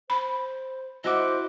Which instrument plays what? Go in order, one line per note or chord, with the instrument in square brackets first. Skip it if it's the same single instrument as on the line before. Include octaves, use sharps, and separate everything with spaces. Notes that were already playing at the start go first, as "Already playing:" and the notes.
[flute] C5 [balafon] B5
[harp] E4 F#4 D6 [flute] C5 [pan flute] D#5